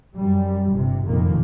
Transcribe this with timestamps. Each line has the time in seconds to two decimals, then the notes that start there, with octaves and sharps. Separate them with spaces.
0.17 F#2 G3
0.73 G1 C3
1.06 F1 C2 F#2 A#2 D#3 A#3